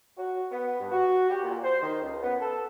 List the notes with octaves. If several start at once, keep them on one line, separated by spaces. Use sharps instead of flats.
F#4
B3
G2
F#4
G4
A#2
C5
D#3
C#2
B3
A4